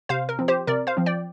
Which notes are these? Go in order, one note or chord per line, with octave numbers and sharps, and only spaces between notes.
C3 C5 F5
A#4
F3 C4
G4 C5
C3 A#4 D5
C5 F5
F3 C4
D5 G5